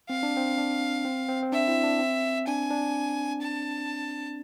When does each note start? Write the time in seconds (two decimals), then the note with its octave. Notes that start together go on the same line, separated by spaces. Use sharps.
0.10 C4 F5
0.23 D4
0.37 C4
0.58 D4
1.05 C4
1.29 C4
1.43 C4
1.52 D4 E5
1.68 C4 E4
1.83 D4
1.99 C4
2.47 D4 G#5
2.71 D4
3.42 A5